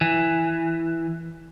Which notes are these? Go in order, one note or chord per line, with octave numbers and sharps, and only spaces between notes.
E3